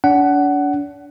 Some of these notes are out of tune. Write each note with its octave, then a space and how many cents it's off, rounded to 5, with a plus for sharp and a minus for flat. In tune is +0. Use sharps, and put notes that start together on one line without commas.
D4 -40 F#5 +15